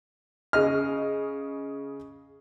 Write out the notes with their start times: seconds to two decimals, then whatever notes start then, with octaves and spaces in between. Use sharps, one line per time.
0.53 C#3 D#5 F6